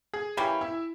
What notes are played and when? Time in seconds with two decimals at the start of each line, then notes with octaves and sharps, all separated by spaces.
0.13 G#4 G#5
0.37 E3 A#3 C#4 G4 G5
0.61 E4 E5